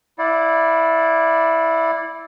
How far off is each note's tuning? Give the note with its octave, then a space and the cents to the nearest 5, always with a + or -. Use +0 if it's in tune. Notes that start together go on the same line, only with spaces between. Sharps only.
E4 -5 D5 +0 F5 +45